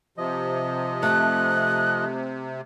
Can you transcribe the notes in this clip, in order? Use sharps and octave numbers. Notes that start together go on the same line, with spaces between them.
C3 F3 D#5
A3 F#6